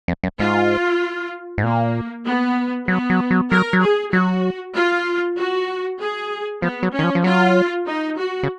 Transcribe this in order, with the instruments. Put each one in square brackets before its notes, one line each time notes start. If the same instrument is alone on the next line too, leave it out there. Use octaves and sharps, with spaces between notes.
[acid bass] F2
F#2
[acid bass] G#2 [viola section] F4
[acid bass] G#2
[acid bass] A#2 [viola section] A#3
[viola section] B3
[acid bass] F#3 [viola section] B3
[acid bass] F#3
F#3
[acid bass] F#3 [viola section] A#4
[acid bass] F#3
[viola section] G#4
[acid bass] F#3 [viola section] F#4
[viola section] F4
F#4
G#4
[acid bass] F3 [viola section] B3
[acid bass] F#3
[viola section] C#4
[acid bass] D#3
F3
F3
[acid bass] F#3 [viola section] F4
[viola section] D#4
F#4
[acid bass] C#3